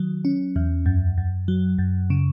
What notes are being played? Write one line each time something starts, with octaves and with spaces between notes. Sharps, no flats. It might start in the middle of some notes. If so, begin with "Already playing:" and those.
Already playing: D#3 F#3
C#4
E2
F#2
F#2
F#3
F#2
C#3